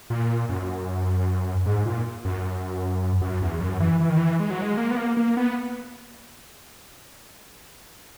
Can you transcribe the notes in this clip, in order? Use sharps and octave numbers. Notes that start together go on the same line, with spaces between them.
A#2
F#2
G#2
A#2
F#2
F#2
E2
F#2
E3
E3
D#3
E3
G#3
F#3
G#3
A#3
B3
A#3
A#3
B3